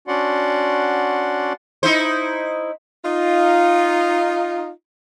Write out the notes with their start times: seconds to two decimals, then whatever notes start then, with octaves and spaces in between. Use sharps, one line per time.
0.08 C#4 D4 F#4 D5 F#5 C6
1.83 D#4 E4 C5
3.05 D#4 F4